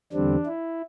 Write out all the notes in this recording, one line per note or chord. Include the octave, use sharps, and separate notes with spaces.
E2 D3 G3 C4 D4
E4